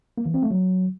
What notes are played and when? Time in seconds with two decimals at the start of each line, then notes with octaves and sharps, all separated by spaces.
0.18 A#3
0.26 E3
0.34 C4
0.42 A3
0.51 F#3